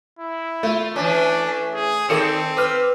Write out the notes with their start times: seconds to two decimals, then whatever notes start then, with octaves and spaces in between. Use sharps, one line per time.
0.19 E4
0.63 A3 F4
0.96 E3 C#4 D4
1.74 G#4
2.09 D#3 C4 D#4 A4 D5 C#7 E7
2.57 B4 D6 F6